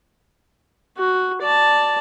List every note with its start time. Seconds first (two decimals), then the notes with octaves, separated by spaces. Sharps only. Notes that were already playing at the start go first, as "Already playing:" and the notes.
0.98 F#4
1.41 D5 A5